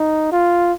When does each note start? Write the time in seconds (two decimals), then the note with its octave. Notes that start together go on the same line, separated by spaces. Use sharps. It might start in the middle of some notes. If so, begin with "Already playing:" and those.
Already playing: D#4
0.32 F4